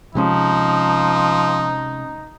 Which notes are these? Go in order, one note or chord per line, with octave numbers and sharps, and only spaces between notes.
C3 F3 G#3 C#4 D#4